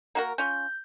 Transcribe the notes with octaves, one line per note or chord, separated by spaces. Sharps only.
A#3 F#4 A#4
C#4 F4 G6